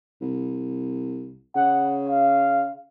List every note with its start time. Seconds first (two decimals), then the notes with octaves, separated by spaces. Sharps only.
0.21 C2
1.56 C#3 F#5
2.09 F5